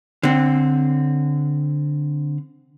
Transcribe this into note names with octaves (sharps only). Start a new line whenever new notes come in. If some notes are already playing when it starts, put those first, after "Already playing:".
D3 C4